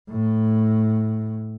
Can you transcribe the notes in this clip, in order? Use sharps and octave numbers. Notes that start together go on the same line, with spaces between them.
A2